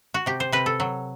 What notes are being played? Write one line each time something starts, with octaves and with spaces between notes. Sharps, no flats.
F#4
C3 G4
C5
C3 B4
A4
F#3